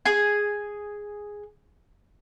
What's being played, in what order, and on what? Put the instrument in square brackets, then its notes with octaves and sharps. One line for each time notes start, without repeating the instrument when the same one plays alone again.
[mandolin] G#4 G#5